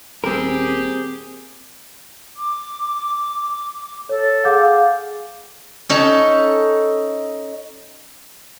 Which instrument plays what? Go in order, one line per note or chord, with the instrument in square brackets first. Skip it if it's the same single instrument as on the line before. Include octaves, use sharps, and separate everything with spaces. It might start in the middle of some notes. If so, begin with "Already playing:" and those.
[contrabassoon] D#1 [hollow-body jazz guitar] C4 A#4 [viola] G4 G#4
[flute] D6
[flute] A4 [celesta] C#5
[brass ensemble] G#4 F5 [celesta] F#5 D6 G6
[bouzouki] C#4 D#4 A4